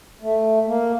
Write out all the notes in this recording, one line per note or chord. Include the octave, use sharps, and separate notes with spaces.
A3
A#3